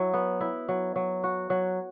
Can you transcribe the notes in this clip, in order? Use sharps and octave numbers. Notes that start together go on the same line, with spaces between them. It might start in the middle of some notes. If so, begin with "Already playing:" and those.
Already playing: F#3 E4
B3
E4
F#3
F#3
F#4
F#3